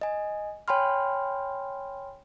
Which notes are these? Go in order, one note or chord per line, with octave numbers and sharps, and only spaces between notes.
D#5 G#5
C#5 G5 G#5 B5 C6 F6